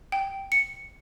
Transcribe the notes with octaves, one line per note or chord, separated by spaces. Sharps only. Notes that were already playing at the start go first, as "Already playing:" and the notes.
G5
C#7